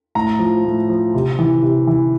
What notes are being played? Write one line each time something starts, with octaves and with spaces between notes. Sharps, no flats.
A2 A#5
F3
A2
F3
C3
E3
C3
E3